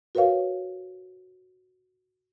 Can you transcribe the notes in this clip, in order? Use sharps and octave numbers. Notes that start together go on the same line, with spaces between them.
F#4 A#4 B4 C#5 F5